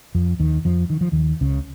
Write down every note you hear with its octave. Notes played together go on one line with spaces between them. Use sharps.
F2 F3
D#2 D#3
F2 F3
D#3
F3
D#2 D#3
C#2 C#3